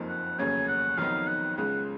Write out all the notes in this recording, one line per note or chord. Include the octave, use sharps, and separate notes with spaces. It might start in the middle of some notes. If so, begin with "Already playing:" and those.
Already playing: F#1 F2 F3 A#3 D#4
F#5
F1 D#2 C#3 F#3 C#4 G#5
F#5
F2 D#3 F#3 B3 D#4 F5
F#5
C#2 C#3 G#3 F#5